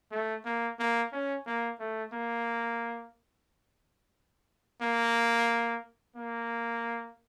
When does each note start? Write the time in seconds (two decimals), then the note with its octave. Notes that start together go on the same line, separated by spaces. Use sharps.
0.12 A3
0.45 A#3
0.79 A#3
1.13 C#4
1.46 A#3
1.80 A3
2.13 A#3
4.82 A#3
6.16 A#3